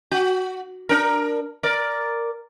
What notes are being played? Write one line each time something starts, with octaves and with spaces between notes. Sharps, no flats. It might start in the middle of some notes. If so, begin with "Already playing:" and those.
F#4
D4 A#4
A#4 D5